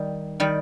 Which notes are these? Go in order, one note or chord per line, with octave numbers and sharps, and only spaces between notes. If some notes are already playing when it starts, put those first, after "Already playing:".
Already playing: D#3 G3
D#3 G3